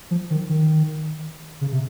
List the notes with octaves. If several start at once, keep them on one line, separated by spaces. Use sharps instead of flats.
F3
D#3
D#3
C#3
C3